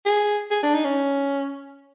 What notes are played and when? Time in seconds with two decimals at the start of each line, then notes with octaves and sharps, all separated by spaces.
0.06 G#4
0.51 G#4
0.63 D4
0.74 D#4
0.85 C#4